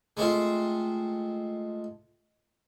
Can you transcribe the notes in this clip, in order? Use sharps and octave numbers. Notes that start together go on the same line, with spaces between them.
G#3 A3 C4 F4